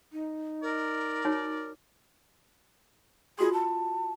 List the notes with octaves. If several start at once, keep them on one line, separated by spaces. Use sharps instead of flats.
D#4
A#4 D5
D#4 F#4 C#5
F4 F#4 G#4 C6
A5